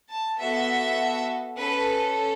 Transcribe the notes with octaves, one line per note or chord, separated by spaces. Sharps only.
A5
B3 F#4 A4 E5
C#4 A4 B4